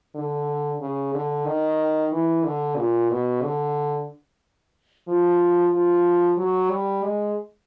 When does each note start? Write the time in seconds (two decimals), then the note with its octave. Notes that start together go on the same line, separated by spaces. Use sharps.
0.15 D3
0.80 C#3
1.14 D3
1.47 D#3
2.12 E3
2.45 D3
2.77 A#2
3.10 B2
3.43 D3
5.08 F3
5.73 F3
6.38 F#3
6.71 G3
7.03 G#3